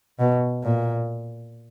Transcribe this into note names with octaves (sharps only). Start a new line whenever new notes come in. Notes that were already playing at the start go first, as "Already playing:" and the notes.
B2
A#2